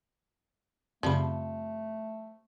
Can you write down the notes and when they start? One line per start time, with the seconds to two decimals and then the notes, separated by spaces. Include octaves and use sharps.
1.03 F#2 C#3 F3 G3 A3 C4 B5